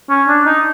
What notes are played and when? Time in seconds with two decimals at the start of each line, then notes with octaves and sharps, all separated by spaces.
0.10 C#4
0.28 D4
0.46 D#4